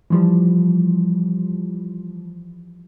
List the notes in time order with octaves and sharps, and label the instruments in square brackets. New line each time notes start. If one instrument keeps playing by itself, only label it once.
[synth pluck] E3 F3 G3